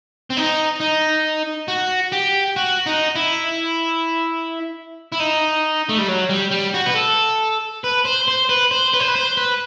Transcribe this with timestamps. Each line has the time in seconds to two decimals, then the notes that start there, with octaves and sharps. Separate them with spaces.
0.30 C4
0.37 D#4
0.80 D#4
1.68 F#4
2.12 G4
2.56 F#4
2.86 D#4
3.15 E4
5.12 E4
5.20 D#4
5.89 A3
5.98 G3
6.08 F#3
6.29 G3
6.51 G3
6.74 F#4
6.86 B4
6.95 A4
7.84 B4
8.05 C5
8.28 C5
8.49 B4
8.71 C5
8.93 B4
9.00 C5
9.08 B4
9.16 C5
9.37 B4